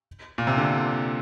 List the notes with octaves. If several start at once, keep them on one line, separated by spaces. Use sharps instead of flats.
A#2
C3
D3